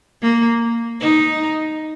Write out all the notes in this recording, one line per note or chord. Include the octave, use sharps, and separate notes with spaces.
A#3
D#4